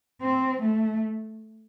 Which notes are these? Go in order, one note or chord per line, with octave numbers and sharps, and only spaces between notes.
C4
A3